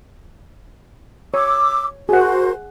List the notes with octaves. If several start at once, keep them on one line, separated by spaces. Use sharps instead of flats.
C#5 D6 E6
F#4 G#4 A#4 C5 F#5